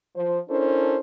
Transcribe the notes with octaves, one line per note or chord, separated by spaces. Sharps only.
F3 C5
C#4 D4 E4 A4 A#4 C5